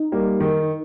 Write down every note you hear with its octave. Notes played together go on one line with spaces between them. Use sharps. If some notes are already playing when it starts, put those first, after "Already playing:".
Already playing: D#4
G3 A#3
D#3